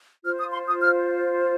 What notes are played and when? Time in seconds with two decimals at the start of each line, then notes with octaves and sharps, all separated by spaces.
0.24 F4 C5 F6
0.39 D#6
0.53 C6
0.67 D#6
0.81 F6